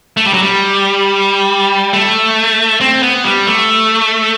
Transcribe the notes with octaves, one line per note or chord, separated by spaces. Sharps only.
A3
G3
F#3
G3
A3
C4
B3
G3
A3